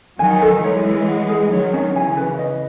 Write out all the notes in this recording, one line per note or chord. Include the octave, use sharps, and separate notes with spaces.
D#3 F#3 G#5
A4
E3 G#3 C#5
E4
F#5
G#4
D#3 F#3 C#5
C#4
C#3 E3 G#5
B4
D#5